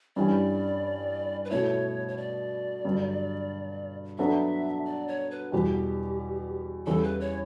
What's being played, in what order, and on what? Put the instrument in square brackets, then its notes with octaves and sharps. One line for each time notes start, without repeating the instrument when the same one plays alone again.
[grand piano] G2 E3 G3 C#4 [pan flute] D5
[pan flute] B4
[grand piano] B2 A3 E4 [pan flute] C#5
[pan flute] C#5
D5
[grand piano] G2 D3 F#3
[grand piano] F#3 B3 D4 F#4 A4 [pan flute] E5
[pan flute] D5
C#5
B4
[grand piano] E2 B2 G3 [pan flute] G4
[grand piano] E2 C#3 E3 G3 [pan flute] A4
[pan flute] B4
C#5